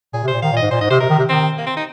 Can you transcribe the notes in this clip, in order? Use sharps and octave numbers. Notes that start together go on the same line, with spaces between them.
A#2 G#4
C3
C5
A#2
D#3 F5
A#2
G#2 D#5
A#2 C5
G#2 D#5
C3 C5
C3 A#4
D#3
C3
D#3 C4
A#3
C4
D#4